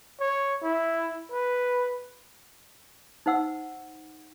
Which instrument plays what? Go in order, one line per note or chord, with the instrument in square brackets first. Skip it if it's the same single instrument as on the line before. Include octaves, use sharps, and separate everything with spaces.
[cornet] C#5
E4
B4
[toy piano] D#4 C5 F#5 E6